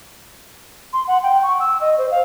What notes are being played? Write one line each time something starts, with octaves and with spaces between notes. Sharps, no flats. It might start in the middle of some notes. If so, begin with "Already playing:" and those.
C6
F#5
G5
C#6
E6
D#5
C5
F5